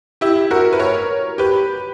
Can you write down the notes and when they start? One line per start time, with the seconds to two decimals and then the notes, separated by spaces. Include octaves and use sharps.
0.21 E4 G4
0.51 F#4 A#4
0.73 B4
0.79 A#4 C#5
1.38 G4 B4